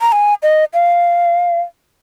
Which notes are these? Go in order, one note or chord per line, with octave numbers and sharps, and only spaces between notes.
A#5
G#5
D#5
F5